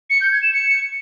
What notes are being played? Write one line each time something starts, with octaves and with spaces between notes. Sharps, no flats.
C#7
G6
G#6
E7
C#7